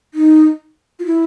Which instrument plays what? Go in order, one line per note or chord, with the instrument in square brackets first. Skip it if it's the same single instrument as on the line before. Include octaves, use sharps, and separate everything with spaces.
[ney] D#4
F4
E4